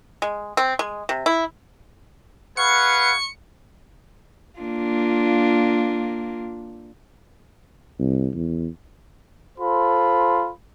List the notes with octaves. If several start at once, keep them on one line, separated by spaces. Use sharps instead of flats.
G#3
C4
G#3
C3
E4
G#4 B4 F5 F#5 C#6 C#7
A#3 D4 F4
C2
E2
F4 A4 C5 B5